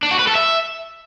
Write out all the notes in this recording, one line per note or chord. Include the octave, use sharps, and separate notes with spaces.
D4
F#4
B4
A4
E5